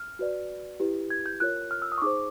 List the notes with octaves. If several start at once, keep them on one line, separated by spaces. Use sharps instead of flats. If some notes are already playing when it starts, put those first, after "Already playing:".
Already playing: F6
F#4 B4 D5
E4 G4 B4
G#6
G6
F4 A#4 C#5 F#6
F6
E6
D#6
C#6
D#4 G#4 C5 D6